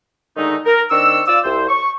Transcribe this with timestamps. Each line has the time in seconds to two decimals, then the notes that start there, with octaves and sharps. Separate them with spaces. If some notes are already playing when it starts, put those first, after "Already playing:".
0.37 D3 D#3 G#3 A3 D#4
0.65 A#4
0.90 D#3 C4 D4 C#6 E6
1.26 F4 D5 E6
1.44 C2 C5
1.68 C#6